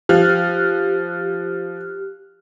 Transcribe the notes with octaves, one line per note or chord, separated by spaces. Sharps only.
F3 G4 F6 F#6